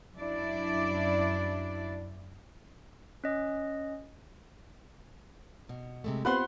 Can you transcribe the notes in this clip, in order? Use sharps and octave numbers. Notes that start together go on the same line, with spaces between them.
F#2 D4 E4 D5
C#4 D#5
B2
C3 G#3 A3
B3 C4 F4 G4 B4 C5 F#5 C6